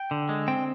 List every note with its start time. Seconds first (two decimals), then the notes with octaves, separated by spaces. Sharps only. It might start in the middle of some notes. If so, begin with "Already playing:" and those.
Already playing: G5
0.11 D3
0.29 G#3
0.48 C4 G5